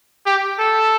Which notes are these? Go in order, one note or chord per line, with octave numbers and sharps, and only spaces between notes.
G4
A4